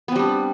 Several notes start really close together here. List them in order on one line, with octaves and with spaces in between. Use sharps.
B3 C4 G3 D4